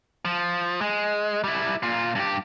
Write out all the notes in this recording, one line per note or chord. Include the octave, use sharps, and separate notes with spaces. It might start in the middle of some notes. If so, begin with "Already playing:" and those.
F3
G#3
G3 E4
A#2 F4
G2 G4